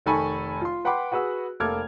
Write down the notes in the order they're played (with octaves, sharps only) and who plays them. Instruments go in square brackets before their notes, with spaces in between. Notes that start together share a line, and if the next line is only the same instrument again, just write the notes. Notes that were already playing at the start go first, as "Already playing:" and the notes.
[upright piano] F1 D#3 A4 G#5 B5 C#6
F4 C6
B4 F#5 G5 B5 C6 D6
F#4 G#4 B4 F#5 E6
F1 A#3 A4 D6 F6 G#6